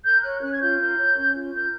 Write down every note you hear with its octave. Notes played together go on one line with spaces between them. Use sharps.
A#4 G6
C#5 F#6
C#4 F#6
G#6
F4 G6
A#4 G6
C#5
C#4
F4
A#4 G6